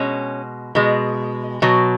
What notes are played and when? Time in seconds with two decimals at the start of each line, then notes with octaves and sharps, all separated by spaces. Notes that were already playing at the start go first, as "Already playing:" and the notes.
Already playing: B2 G#3 C#4
0.75 B2 G#3
1.62 B2 F#3